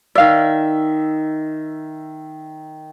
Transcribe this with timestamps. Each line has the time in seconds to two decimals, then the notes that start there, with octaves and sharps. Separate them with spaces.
0.15 D#3 D5 E5 F5